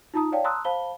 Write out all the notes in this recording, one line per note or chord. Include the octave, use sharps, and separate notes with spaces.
D#4 F4 A5 A#5 D#6
C#5 D5 F5 G5 A5
A5 A#5 C6 D#6 E6 F#6
C5 F5 A5 B5 G7